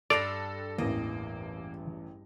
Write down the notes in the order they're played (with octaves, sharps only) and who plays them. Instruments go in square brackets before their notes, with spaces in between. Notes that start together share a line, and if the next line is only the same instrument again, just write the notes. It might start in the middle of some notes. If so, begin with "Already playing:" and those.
[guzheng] G2 D4 C6 [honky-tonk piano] A4 A6 A#6 [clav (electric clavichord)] D5 [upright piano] F7
[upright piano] A1 E2 [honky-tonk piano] A#3 [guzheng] D#5